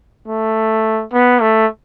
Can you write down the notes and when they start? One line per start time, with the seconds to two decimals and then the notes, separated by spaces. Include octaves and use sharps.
0.28 A3
1.13 B3
1.41 A3